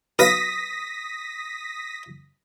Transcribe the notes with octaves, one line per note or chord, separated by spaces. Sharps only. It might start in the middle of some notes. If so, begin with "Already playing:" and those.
B1 B4 F5 D#6 A#6 B6